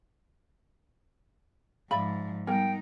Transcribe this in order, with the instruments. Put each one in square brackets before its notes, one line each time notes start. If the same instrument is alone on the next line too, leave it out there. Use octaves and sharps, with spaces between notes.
[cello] G#2 F3 [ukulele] D5 E5 B5 [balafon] F5
[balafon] G3 B3 [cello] D#4 [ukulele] A#4 [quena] G5